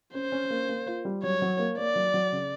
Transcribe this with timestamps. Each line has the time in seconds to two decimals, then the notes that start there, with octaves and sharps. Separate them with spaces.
0.14 C#4 C5
0.32 C#4
0.50 A#3
0.69 A#3
0.87 F4
1.05 G3
1.23 F#3 C#5
1.42 F#3
1.59 A#3
1.78 A#3 D5
1.96 F#3
2.14 F#3
2.32 C#3